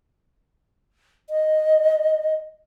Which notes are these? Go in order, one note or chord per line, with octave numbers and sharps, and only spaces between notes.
D#5